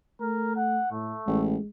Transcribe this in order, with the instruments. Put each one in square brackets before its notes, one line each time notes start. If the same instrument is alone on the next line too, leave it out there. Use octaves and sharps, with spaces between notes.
[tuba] A3 [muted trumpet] A#4
[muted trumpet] F#5
[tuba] A2 [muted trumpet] A3
[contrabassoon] A1 [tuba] G#3